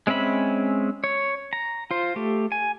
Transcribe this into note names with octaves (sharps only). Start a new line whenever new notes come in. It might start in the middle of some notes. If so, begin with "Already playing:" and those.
G#3 C4 C#4 E5 B5
C#5
A#5
F4 C5
A3 G4
G#5